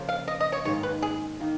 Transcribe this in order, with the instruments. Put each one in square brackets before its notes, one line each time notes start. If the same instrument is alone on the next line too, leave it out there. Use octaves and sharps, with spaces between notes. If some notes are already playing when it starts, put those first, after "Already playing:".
Already playing: [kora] C#3 F3 A#3 F4
[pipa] F5
D#5
D#5
C#5
[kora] G#2 D#3 A#3 C#4 [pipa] C#5
[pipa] B4
G#4
[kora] D#3 A#3